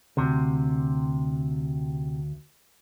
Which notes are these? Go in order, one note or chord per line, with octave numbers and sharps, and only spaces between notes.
D2 C3